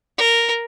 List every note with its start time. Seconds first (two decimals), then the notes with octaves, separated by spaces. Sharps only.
0.18 A#4